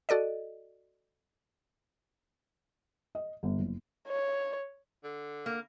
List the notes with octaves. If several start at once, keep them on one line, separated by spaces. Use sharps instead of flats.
F#4 A4 D5 D#5
D#5
G1
F#1
C#5
D3
A#3